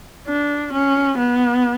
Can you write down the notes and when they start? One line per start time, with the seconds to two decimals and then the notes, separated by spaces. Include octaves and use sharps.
0.27 D4
0.73 C#4
1.18 B3